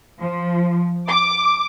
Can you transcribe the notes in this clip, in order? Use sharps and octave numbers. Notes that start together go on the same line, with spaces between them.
F3
D6